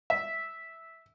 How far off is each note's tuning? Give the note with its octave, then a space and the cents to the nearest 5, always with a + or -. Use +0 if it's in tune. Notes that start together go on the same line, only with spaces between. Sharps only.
E5 -10